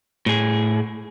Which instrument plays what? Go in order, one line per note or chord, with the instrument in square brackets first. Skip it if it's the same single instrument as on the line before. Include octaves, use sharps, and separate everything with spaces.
[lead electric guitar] A2 G#4